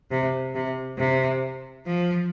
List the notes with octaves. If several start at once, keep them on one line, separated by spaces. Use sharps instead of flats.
C3
C3
C3
F3